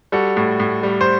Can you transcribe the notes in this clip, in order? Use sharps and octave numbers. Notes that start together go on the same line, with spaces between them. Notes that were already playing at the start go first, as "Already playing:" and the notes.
G3 F#4 A4
A2
A2
G3
C5